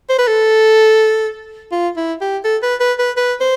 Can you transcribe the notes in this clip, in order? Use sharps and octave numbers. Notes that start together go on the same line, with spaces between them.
C5
B4
A4
F4
E4
G4
A4
B4
B4
B4
B4
C5